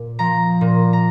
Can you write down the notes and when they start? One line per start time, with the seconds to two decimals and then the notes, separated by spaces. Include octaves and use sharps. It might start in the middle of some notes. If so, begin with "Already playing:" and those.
Already playing: A#2
0.19 F3 A#5
0.61 A#2
0.93 A#5